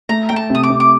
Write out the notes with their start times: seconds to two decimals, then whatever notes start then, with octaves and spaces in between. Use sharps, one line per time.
0.09 A3 A#5
0.29 A3 G5
0.36 A5
0.50 C3 D#6
0.63 D6
0.70 C3
0.80 D6